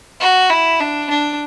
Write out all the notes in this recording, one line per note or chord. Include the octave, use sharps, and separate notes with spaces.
F#4
E4
D4
D4